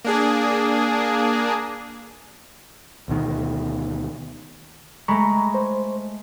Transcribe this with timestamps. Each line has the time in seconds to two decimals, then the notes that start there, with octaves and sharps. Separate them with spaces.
0.04 A#3 D4 G#4
3.08 D2 B2 D#3
5.08 G#3 A3 A#5 B5 C#6
5.54 C5